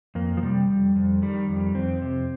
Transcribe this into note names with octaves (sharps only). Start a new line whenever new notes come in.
F2 A#3
F3
C3 G3
F2
F2
D#3 G3
F2
F2 C4
C3